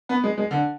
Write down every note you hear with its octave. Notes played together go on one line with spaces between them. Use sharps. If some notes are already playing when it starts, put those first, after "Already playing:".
B3
G#3
G#3
D3